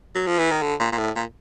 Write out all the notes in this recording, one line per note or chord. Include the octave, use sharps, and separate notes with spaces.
F#3
F3
E3
D#3
D3
A#2
A#2
A2
A#2